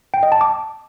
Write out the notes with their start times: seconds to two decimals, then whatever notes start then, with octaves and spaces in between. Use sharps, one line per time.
0.14 G5
0.23 D#5
0.32 A5
0.41 D6